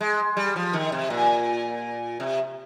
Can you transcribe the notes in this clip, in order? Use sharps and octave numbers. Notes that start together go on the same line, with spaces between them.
G#3
G3
F3
D#3
C3
A#2
C3